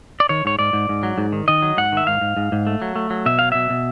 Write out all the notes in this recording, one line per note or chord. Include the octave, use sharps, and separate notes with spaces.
D5
D#3 C#5
G#2 C#5
G#2 D5
G#2
G#2
F#3
G#2
D#3
D#3 D#5
F#3
G#2 F#5
D#3 E5
G#2 F5
G#2
G#2
G#2
A3
F#3
A3
F#3
B2 E5
F#3 F5
B2 E5
B2